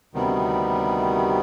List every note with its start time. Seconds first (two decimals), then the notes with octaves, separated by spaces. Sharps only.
0.14 D2 C3 D#3 G3 B3